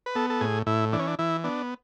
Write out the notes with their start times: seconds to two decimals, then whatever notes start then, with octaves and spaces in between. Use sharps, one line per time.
0.06 B4
0.15 B3 A4
0.30 A4
0.41 A2 G#4
0.66 A2 E4
0.93 E3 D4
0.99 C#4
1.07 D4
1.19 E3 E4
1.44 B3 D4